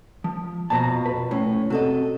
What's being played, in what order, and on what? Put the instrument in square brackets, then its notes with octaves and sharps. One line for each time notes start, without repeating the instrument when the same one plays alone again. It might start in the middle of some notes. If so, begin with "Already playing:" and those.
[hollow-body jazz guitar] F3
[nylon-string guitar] F2 B2 [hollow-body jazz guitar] A5 A#5
[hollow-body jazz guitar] B4
[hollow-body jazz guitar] A2 [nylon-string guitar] C#4
[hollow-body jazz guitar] C3 [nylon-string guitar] F#4 A4 D#5